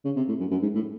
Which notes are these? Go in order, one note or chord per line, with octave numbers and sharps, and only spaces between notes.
C#3
C3
A2
F#2
F#2
G#2
A2